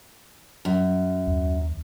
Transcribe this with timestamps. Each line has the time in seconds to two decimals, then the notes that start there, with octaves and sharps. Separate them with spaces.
0.65 F#2
1.27 D#2